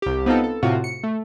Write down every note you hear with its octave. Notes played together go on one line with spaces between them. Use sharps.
C2 G4
B3 C4 D#4 F4 A4
A4
A2 C3 F4 F#4
C#7
A3